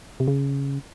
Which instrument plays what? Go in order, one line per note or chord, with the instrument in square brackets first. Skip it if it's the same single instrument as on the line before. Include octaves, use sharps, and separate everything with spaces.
[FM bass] C3
C#3